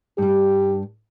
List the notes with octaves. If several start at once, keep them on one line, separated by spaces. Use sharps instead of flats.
G2 G3 G4